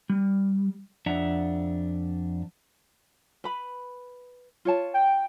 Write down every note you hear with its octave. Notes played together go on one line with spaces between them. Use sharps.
G3
F2 D4 E5 F#5 A#5
B4 B5
F4 C#5 A5
G5